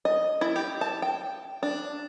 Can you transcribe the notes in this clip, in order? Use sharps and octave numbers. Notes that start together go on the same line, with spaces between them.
D#5
E4
G4
A5
G5
D4